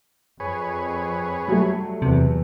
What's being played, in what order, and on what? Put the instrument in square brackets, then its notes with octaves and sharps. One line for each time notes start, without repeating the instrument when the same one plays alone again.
[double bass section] F2 [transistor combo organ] G#4 B4 C#5
[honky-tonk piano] F#3 G3 A3
[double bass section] E2 [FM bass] C3